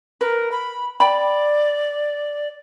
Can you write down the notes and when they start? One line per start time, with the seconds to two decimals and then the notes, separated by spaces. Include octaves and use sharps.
0.21 A#4 B4
0.52 B5
1.00 D5 G5 B5